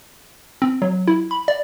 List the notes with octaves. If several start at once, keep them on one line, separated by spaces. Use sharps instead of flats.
C4
F#3
E4
B5
D5